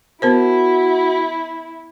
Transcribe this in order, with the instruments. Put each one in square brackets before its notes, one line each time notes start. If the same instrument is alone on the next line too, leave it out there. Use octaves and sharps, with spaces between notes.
[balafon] B3 A#4 C5 [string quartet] E4 [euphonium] F#4